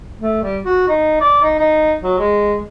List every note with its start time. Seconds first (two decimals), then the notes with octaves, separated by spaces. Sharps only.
0.20 A3
0.42 G3
0.65 F#4
0.89 D#4
1.21 D5
1.43 D#4
1.59 D#4
2.02 F#3
2.19 G#3